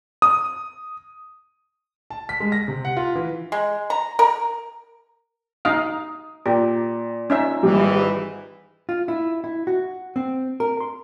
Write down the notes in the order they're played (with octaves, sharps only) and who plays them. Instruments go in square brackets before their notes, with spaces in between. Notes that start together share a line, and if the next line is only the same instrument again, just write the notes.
[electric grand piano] D#6
[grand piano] A5
B6
G#3
A#6
C3
F#5
F4
E3
[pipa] G#3
A#5
A#4
[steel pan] D#4 F5 [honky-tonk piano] D#6
[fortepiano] A#2 [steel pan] G4
[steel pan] C#4 D#4 E5
[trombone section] G#1 G#2 E3 [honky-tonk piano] G3
[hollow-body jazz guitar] F4
E4
E4
F#4
C4
A#4
C6